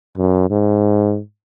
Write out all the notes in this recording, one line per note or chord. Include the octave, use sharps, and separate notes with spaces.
F#2
G#2